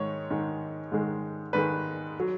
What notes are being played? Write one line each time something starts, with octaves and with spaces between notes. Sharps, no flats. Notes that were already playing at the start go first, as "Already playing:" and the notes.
Already playing: G#2 D#3 G#3 C#5
G#2 D#3 G#3
G#2 D#3 G#3
G#2 D#3 G#3 B4
F#3